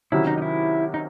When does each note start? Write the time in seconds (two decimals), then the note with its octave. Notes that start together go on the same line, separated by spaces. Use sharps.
0.12 C3 D#3 F#3 C#4 E4
0.27 D#4
0.38 D#4
0.42 E4
0.94 D#4